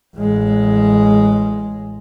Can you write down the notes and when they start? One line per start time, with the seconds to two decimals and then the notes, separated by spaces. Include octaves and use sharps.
0.16 A1 G#3